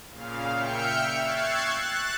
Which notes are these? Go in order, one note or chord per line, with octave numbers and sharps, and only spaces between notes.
A#2 C#3 F5
E5 G5 F6 G6 C#7
C#6 E6 F#6 G#6 A6 C7
F#6 A6 E7